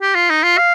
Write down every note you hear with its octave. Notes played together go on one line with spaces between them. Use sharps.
G4
F4
D#4
F4
F5